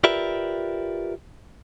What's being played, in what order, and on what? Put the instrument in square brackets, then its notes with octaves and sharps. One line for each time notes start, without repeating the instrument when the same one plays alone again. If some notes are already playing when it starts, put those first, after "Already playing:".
[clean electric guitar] F4 G4 A#4 B4 D5 E5